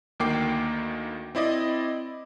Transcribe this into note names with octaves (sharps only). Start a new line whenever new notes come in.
D2 D#3 A#3 G5 D6 C7
C4 E4 D5 D#5